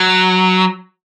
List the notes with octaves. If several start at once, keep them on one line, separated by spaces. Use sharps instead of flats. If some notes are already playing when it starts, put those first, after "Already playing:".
Already playing: F#3